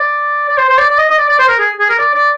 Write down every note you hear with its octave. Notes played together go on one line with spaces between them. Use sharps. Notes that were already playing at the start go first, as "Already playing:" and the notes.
Already playing: D5
D5
C5
C5
D5
D5
D#5
D#5
D5
D5
C5
A#4
G#4
G#4
A#4
D5
D5